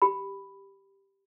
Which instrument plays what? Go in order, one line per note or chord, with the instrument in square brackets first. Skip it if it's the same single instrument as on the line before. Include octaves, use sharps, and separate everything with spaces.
[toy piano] G4 B5